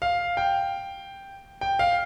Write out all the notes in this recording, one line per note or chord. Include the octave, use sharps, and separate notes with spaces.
F5
G5
G5
F5